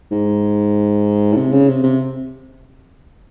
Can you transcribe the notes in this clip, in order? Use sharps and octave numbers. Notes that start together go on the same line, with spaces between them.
G#2
A2
C3
C#3
C3
C3